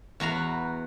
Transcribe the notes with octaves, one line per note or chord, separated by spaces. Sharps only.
E2 F#4 B4 A#5